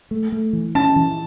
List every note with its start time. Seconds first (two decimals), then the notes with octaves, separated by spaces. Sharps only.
0.11 A3
0.32 A3
0.53 E3
0.75 C#4 A5
0.96 E3